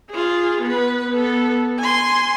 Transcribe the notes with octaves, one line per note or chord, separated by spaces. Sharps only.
F4 G#4
B3 B4
B3 A4
G#5 C6